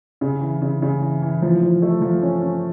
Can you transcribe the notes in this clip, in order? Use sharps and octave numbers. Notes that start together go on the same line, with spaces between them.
C#3
E3
C#3
C#3
E3
E3
F3
F3
A3
F3
C#4
C#4